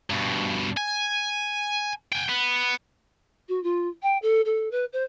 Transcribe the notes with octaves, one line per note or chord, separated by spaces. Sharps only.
G2 B2
G#5
G5 G#5
B3
F#4
F4
G5
A4
A4
B4
C5